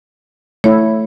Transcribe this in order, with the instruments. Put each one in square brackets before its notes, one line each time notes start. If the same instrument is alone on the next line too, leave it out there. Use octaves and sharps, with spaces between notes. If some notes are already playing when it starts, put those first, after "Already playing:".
[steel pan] A3 E4 [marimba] C#5